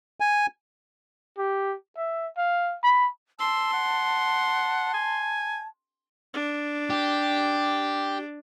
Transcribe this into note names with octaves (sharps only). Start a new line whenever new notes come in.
G#5
G4
E5
F5
B5
A5 C6 E6
F#5
G#5
D4
G4